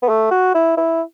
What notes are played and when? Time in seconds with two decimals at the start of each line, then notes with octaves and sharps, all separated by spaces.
0.03 B3
0.09 A3
0.31 F#4
0.55 E4
0.77 E4